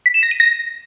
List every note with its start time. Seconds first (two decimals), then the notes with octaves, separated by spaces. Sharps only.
0.06 B6
0.14 E7
0.23 A#6
0.31 D#7
0.40 A#6